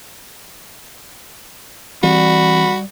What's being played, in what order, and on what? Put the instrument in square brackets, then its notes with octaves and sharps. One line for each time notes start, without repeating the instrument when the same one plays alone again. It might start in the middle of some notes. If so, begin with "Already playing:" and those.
[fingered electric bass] E3 C4 [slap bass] G3 [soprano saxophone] F#4 [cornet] B5